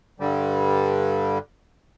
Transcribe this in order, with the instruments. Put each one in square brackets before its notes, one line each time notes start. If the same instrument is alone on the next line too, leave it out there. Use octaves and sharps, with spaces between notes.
[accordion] G2 D3 G3